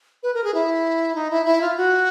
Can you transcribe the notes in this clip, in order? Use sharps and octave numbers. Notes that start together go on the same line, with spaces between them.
B4
A#4
G#4
E4
D#4
E4
E4
F4
F#4